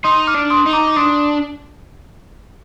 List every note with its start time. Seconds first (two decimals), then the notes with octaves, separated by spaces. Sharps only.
0.04 D#4 C6 D#6
0.27 D6 F6
0.34 D4
0.50 C6 D#6
0.66 D#4
0.73 A#5 D6
0.87 D6
0.97 D4 C6 D#6